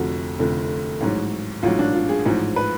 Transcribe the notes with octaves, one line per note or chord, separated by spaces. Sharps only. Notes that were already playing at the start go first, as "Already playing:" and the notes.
Already playing: F1 F2 D3 F#4
F1 F2 D3
A1 G#2 F#3
A1 G#2 F#3 F4
D4
F4
G#4
A1 G#2 F3
B4